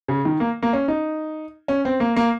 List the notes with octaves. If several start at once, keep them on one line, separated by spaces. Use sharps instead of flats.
C#3
D#3
A#3
A#3
C#4
D#4
C#4
C4
A#3
A#3